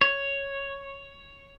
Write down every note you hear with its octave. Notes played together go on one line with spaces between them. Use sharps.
C#5